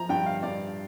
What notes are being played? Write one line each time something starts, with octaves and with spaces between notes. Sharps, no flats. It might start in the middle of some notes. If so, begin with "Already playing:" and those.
Already playing: F3 A#5
G2 G5
F5
G2 D5